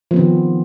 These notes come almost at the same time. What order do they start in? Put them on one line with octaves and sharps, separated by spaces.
F3 B3 C4 D#3